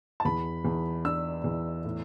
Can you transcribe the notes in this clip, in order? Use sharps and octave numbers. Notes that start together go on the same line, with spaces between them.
A5
E2 B5
E2
D4 E6
E2
A2